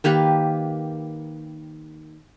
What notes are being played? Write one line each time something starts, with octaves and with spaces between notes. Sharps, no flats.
D#3 A#3 G4 B4